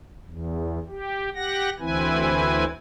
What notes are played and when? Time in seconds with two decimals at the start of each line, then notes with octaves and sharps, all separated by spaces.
0.26 E2
0.89 G4
1.36 G4 F#5 A#6
1.80 D2 E3 C4 E4 B4 G#5